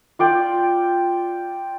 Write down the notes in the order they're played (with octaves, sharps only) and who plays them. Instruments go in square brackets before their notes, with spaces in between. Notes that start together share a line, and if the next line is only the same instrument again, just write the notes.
[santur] F4 D5 G5